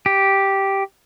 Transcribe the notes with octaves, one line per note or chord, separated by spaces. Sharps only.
G4